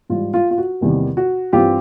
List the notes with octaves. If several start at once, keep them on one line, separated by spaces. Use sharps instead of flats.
G#2 E3 G3 F4
F4
F4
F#4
E2 C3 D#3 G3 A#3
F#4
G2 E3 G3 C4 F4 G4